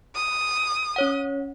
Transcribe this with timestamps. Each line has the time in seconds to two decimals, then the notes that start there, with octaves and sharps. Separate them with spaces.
0.15 D#6
0.96 C#4 C#5 F#5